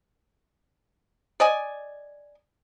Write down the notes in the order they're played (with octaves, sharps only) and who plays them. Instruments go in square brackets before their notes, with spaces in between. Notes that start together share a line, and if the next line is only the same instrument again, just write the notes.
[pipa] D5 D#5 G#5